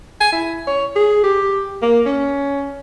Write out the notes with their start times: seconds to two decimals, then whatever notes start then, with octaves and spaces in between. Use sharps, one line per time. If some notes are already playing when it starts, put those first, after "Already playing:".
0.21 G#5
0.32 E4
0.67 C#5
0.96 G#4
1.24 G4
1.82 A#3
2.06 C#4